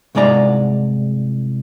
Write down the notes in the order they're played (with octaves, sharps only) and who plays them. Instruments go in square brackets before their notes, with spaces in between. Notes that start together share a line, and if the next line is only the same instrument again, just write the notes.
[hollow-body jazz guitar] C2 G#2 G#3 D5 A#5